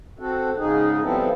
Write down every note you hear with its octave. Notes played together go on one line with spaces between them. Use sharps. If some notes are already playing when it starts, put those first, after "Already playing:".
C4 F#4 A4
G#2 C#3 D#4 G#4
F3 G3 B3 C4 E4 A4